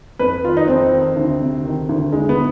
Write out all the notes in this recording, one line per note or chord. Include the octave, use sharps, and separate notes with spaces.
F2 B4
D#3 F4
D#4
F2 C4
D#3
D2
C3
D#3
D2
D2 G#3
B3